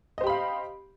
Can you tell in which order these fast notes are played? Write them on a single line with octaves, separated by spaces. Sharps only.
D#5 C5 G4 B5 F5